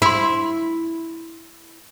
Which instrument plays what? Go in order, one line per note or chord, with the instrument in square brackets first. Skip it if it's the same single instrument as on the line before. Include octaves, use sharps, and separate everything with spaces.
[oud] E4 [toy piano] B5 C6